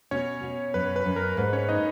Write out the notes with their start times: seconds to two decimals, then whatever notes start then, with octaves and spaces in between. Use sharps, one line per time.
0.11 B2 C#4 C#5
0.43 B2
0.74 F#2 B4
0.96 B4
1.06 F#2
1.16 A#4
1.37 G#2 B4
1.53 C#4 C#5
1.68 A#3 D#4 D#5